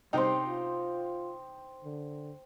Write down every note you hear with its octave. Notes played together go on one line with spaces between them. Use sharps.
C3 G3 D#4 C5 G5
F4
D3